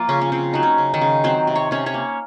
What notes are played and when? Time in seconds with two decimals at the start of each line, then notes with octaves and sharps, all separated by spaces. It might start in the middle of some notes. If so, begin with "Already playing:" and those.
Already playing: F3 A#3 F4
0.09 C#3 C#4
0.21 C#4
0.32 C#3 C4
0.53 F#3 D#4
0.63 C#4
0.78 C#3
0.94 D#3 D#4
1.01 C#3
1.24 F#3 C4 C5
1.47 C3
1.56 C#5
1.71 C3 C#4 C#5
1.86 C#4 C#5
1.94 A#3